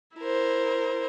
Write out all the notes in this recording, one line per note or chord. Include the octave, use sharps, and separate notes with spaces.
E4 A#4 C5